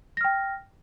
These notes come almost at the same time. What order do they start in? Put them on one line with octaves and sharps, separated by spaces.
A#6 F6 G5